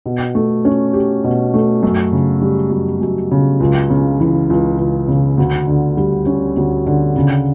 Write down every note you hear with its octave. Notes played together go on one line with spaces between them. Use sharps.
B2
A3
C#4
G4
B2
A3
F#2
C#3
G3
F#2
F#2
C#3
C#2
C#3
E3
C#2
C#2
C#3
D2
D3
G3
C#4
D2
D3
C#3